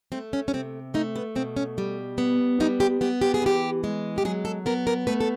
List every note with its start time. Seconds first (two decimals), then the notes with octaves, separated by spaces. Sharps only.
0.12 A3 C4
0.33 C#4
0.48 C#4
0.54 C3 C4
0.94 A3 D#4
1.16 B3
1.35 B2 C4
1.57 C#4
1.78 G3
2.18 B3
2.60 G3 D#4
2.80 G4
3.01 B3 G4
3.21 G4
3.34 G#4
3.42 E3 G4
3.84 G#3
4.18 G4
4.25 F#3 G#4
4.45 A4
4.66 B3 A#4
4.87 A#4
5.07 A3 B4
5.20 A4